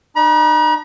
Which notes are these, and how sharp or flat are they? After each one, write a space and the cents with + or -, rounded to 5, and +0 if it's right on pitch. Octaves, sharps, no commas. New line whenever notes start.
D#4 -45 A#5 +45